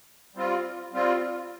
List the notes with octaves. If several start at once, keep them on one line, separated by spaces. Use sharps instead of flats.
G3 C4 F4
G3 C4 F4